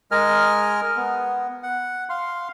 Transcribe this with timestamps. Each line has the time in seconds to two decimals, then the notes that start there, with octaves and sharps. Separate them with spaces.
0.11 G#3 A#4 D#5 G#5 F6
0.97 B3
1.63 F#5
2.09 F5 C6